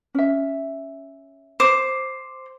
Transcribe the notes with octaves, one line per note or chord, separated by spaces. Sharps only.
C#4 E5
C5 D6